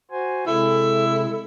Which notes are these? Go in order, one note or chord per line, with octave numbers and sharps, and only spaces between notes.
F#4 C5 G#5
C3 G#3 E4 A4